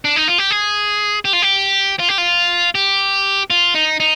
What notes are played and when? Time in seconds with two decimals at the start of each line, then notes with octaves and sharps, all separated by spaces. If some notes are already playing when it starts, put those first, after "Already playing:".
0.05 D4
0.16 D#4
0.28 F4
0.38 G4
0.51 G#4
1.25 G4
1.33 F4
1.42 G4
1.99 F4
2.09 G4
2.18 F4
2.75 G4
3.50 F4
3.74 D#4
4.00 D#4